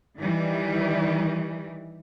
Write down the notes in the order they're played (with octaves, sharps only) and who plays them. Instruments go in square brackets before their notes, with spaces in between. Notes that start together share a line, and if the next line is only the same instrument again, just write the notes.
[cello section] D#3 E3 G3